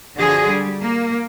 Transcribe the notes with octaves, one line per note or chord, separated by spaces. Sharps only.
D3 F3 F#4 G#4
G3
A#3